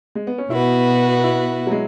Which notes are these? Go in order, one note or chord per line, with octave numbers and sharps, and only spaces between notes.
G#3
B3
C#4
B2 B3 E4 F#4 B4
E4
F#3
G#3